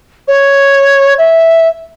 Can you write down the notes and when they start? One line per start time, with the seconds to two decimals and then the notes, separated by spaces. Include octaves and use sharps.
0.28 C#5
1.18 E5